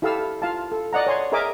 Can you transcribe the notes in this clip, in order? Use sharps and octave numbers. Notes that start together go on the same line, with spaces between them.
E4 G4 A4 F5 A5 E6
F4 F5 A5
A4
D5 D#5 F#5 A#5
C#5 G#5 C6
G#4 A#4 D#5 E5 G#5 D6